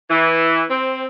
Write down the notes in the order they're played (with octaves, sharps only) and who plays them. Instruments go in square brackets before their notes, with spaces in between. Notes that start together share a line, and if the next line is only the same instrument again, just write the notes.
[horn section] E3
C4